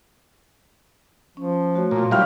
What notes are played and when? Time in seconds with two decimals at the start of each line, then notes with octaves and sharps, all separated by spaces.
1.37 F3 C#4
1.74 A3 F#4 C#5
1.91 A#2 F4
2.11 F#3 G3 D#4 F5 C#6 F6